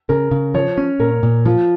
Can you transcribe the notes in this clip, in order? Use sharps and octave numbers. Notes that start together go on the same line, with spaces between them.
C#3 A#4
C#3
F3 C#5
C#4
A#2 A#4
A#2
F3 F4